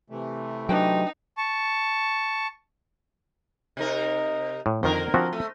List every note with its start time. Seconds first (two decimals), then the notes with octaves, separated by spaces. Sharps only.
0.10 C3 E3 A3
0.69 F#3 D4 D#4 B4 G5
1.37 A5 C#6
3.77 C3 D#4 A#4
4.66 A2
4.83 F2 D3 D#3 A#4 C5
5.14 F3 C4 F#4
5.33 A3